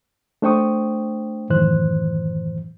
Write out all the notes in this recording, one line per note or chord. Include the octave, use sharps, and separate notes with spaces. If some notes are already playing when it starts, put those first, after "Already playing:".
A3 D4 C5 G5 C#6 D#6
F#2 A2 D#3 E3 C5 F#6